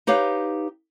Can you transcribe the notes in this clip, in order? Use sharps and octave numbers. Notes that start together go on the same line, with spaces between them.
D#4 G4 B4 C#5 F5